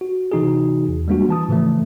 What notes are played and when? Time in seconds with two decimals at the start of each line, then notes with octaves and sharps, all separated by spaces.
0.01 F#4
0.32 C3 E3 D#4 F#4 G#4
0.88 E2
1.08 G3 G#3 A#3 D4 F4 F#4
1.29 E3 A5 D#6
1.49 A2 C#3 E3 F3 A3